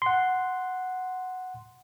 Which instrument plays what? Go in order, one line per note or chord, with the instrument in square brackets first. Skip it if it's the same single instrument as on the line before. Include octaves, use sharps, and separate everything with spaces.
[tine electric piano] F#5 C6